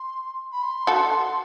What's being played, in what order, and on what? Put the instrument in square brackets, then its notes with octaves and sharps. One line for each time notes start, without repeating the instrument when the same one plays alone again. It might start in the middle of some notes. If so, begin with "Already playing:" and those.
Already playing: [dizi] C6
B5
C6
[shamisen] F#4 A4